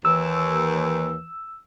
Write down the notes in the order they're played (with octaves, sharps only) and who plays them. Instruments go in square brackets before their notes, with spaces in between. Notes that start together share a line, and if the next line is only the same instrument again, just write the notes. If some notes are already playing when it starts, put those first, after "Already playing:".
[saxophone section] D#2 [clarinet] E3 [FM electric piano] E6